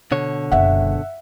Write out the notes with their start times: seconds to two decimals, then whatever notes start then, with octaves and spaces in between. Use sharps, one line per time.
0.11 B2 D3 C#5
0.52 F#1 G3 E5 F#5